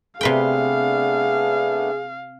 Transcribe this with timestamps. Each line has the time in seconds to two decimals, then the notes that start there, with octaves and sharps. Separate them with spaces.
0.21 C3 A3 B3 D4 G#4 B4 F5 G5